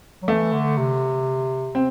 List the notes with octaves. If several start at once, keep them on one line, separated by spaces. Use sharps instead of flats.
F#3
E3 A3
D3
C3
C4